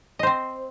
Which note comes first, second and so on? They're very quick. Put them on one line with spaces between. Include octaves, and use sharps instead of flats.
D#5 C5 C4